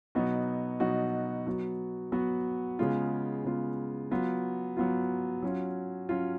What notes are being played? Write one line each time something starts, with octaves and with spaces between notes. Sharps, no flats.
B2 F#3 B3 D#4 F#4
B2 F#3 B3 D#4 F#4
F#3 B3 F#4
F#3 B3 F#4
C#3 G#3 B3 F4
C#3 G#3 B3 F4
F#3 B3 F4
F#3 B3 F4
F#3 C#4 F4
F#3 C#4 F4